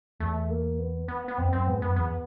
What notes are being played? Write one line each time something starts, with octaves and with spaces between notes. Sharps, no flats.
E2 A3
A#3
B3
B3
B3
F2 C4
F#2 C4
G#2 B3
F#2 B3
E2 B3